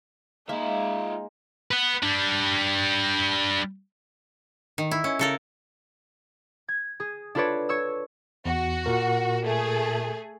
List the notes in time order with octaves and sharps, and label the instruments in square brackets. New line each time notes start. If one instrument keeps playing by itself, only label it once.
[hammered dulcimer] G#3 [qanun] A#3 [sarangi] D#4 [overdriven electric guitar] F4 E5
[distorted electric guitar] B4 F#5
G3 D4
[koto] D#3
E4
C#4
C#3 A4 A#4
[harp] G#6
G#4
D4 F4 A4 B4 C#5 D5
C#5 C#6 E6
[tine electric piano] E2 [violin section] F#4
[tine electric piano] A#2 A#4
[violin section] A3 G#4